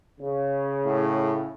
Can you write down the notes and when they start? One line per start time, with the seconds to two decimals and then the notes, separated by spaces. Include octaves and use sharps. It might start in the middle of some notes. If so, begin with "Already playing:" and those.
0.20 C#3
0.85 A2